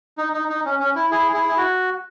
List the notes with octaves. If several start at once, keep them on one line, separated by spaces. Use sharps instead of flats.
D#4
D#4
D#4
C#4
C#4
E4
E4 G#4
E4 G#4
E4
F#4